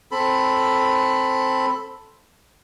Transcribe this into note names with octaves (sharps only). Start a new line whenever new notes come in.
C4 A4 B5